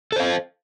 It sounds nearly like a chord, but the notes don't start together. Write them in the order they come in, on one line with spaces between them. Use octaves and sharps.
A4 C5 F5